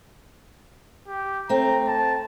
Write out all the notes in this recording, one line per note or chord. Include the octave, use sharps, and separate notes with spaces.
G4
A3 C4 A#5
A5